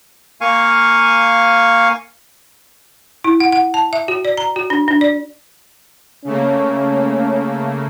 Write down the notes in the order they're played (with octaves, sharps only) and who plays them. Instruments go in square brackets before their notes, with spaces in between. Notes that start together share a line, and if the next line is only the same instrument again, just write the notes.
[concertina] A#3 F5 G#5 C#6
[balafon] E4
F#5
F#5
A5
E5
F#4
D5
A#5
F#4
D4
D4
D5
[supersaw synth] C#3 A3 A#3 [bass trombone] C#4